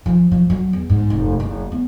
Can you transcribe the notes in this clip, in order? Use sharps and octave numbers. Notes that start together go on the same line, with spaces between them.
F3
F3
F#3
E2
G#2
F1
F#1
B3